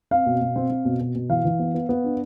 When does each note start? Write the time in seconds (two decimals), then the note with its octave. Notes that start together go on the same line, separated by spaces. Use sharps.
0.11 C4 F5
0.26 B2
0.41 B2
0.56 C4
0.70 C4
0.85 B2
1.01 B2
1.15 B2
1.30 E3 F5
1.45 E3
1.59 B3
1.74 B3
1.89 B3
2.04 D4